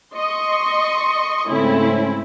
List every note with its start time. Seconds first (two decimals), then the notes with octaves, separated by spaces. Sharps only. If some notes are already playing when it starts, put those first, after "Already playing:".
0.14 D#5 C6 C#6
1.47 G#2 C#3 A3 C4 C#4 E4